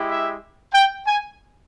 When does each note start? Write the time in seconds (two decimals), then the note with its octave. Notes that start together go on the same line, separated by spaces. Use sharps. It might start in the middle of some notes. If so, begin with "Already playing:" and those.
Already playing: G#3 E4 G4
0.09 E5
0.74 G5
1.06 G#5